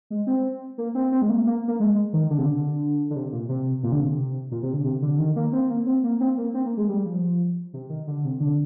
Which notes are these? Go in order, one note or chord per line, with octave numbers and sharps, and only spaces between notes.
G#3
C4
A#3
C4
C4
G#3
A#3
A#3
A#3
G#3
D#3
D3
C3
D3
D3
C3
A#2
C3
A#2
D3
C3
A#2
C3
D3
C3
D3
D#3
A#3
C4
A#3
C4
A#3
C4
A#3
C4
A#3
G#3
G3
F3
C3
D#3
D3
C3
D3